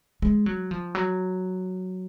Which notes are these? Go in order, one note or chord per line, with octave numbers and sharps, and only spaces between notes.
G#3
F#3
F3
F#3